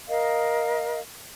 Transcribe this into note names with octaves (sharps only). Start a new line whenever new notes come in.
A#4 D#5 F5